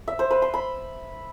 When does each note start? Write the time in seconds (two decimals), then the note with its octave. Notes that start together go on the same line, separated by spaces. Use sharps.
0.08 E5
0.19 C5
0.31 B4
0.42 C6
0.54 B5